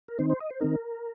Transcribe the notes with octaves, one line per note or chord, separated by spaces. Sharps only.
A#4
D#3 C4 D#4 C5
C5
D#5
C5
D#3 C4 D#4 A#4